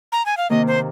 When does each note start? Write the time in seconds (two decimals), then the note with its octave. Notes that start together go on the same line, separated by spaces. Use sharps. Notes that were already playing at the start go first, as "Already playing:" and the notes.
0.12 A#5
0.26 G#5
0.37 F5
0.50 C3 D#3 A#3 D#5
0.67 C5